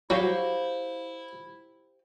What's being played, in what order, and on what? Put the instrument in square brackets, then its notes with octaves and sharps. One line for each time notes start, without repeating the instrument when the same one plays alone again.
[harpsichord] F#3 [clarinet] E4 [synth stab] F#4 [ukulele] G4 C5 F5